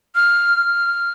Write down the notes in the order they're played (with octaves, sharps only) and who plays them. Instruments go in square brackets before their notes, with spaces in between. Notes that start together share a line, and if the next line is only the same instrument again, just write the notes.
[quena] F6